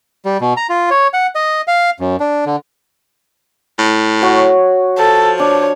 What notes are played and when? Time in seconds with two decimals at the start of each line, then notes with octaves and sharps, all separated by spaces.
0.25 G3
0.41 B2
0.57 A#5
0.69 F4
0.91 C#5
1.14 F#5
1.35 D#5
1.68 F5
2.00 F#2
2.20 D4
2.46 D3
3.79 A2
4.22 F#4 C#5
4.99 F3 A4
5.40 D4 C#5